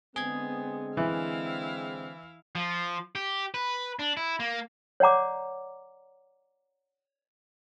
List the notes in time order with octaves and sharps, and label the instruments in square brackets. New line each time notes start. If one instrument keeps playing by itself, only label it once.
[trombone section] D3 G#3 C4 [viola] B3 [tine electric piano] G#4 G#6
[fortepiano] E3 [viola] E4 F5
[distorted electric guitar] F3
G4
B4
D4
E4
A#3
[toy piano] C#5 D5 F#5 A#5 D6